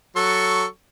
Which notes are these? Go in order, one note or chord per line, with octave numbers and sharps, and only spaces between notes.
F#3 A4 C#6